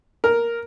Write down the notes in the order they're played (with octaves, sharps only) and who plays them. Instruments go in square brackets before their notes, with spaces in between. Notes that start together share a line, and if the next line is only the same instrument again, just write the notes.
[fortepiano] A#4